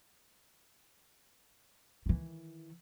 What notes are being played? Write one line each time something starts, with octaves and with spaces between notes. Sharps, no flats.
D#3 E3